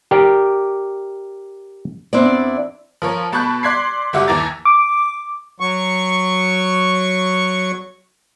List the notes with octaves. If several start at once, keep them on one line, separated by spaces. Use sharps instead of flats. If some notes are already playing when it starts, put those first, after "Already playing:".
G4 A#4 D5 G5
E2 C4 D4 E4 D5
F3 A#4 C#5
B2 A5 B5 C#6 F#6 G6
D5 C6 F#6 G#6 B6 C7
F#1 G3 F#4 E5 F#5 D6
D#2 E3 E4 A#5 D6 A6
D6
F#3 C#6